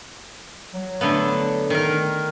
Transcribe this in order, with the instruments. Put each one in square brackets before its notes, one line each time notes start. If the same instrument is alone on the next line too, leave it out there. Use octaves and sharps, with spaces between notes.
[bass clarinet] F#3
[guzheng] D3 A3 B3
D#3 A#4